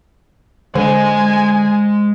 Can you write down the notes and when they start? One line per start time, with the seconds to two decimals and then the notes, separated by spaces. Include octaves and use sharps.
0.75 D3 G#3 C5 D#5 G#5